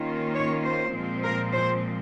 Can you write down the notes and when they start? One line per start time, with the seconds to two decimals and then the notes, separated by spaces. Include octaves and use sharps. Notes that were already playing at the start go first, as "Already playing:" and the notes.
Already playing: D#3 A#3 C#4 F4
0.35 C#5
0.64 C5
0.94 A#2 F3 G#3 C4
1.23 A#4
1.52 C5